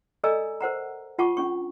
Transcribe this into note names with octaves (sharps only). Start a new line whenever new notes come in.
A4 D5 D#5 G#5 A#5 E6
A#4 C5 F#5 A#5
F4 F#5 A5 C#6 D6
C#4 D4 C#6